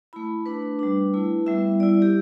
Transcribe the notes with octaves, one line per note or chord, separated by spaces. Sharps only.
A3 E4 B5
A3 D4 B4
G3 D4
A3 E4
G3 B3 E4 E5
G3 E4 D5
G4